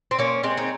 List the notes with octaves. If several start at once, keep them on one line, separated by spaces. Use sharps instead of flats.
C4
A#3 C#4
G#3 C4
D#4